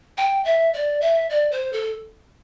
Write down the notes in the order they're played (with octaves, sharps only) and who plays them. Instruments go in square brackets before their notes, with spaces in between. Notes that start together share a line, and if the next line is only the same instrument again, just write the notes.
[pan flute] G5
E5
D5
E5
D5
C5
A4